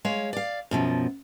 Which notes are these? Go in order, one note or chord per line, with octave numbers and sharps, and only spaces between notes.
G#3 C#5 F5
D5 F5
F#2 B2 F3